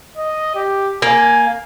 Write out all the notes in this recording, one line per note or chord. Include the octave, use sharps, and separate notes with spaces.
D#5
G4
A#3 G#5